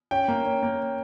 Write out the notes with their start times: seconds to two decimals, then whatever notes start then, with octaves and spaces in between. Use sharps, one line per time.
0.11 C#4 G5
0.28 A#3
0.45 C#4
0.63 A#3